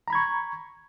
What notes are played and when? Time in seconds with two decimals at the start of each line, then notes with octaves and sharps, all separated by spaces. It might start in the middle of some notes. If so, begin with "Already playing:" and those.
0.08 A#5
0.10 B5
0.13 G#6
0.15 C#6